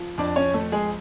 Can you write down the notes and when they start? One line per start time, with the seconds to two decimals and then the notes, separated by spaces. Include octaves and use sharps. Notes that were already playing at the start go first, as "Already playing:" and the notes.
Already playing: F3
0.18 F2 D4 D5
0.36 C#4 C#5
0.54 F2 A3 A4
0.72 G#3 G#4